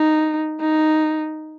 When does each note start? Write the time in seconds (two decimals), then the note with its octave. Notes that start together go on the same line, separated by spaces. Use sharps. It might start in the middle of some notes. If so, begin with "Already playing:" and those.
Already playing: D#4
0.61 D#4